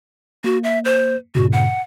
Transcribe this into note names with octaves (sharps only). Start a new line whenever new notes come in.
A#3 F#4
E5
C5
G2 A#2 C#3 F#4
F#5